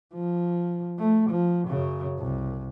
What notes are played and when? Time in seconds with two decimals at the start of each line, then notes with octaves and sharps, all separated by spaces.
0.14 F3
0.99 A3
1.30 F3
1.68 F#2 C#3
2.19 C2